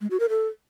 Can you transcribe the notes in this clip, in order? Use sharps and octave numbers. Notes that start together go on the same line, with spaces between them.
G#3
F#4
A#4
A4